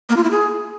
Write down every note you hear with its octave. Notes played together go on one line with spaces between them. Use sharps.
A#3
F4
E4
G#4